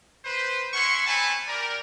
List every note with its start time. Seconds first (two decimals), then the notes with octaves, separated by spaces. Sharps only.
0.24 B4 C5
0.74 C#4 E4 F#5 C6 C#6
1.06 A3 C4 C#4 G#5 A5 B5
1.48 G4 A#4 D5